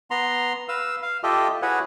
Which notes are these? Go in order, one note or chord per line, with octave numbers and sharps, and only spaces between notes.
B3 A#5 C6
B4 F5 E6
F5
F4 G4 A4 D#5 E5
E4 F#4 G#4 B4 C#5 F#5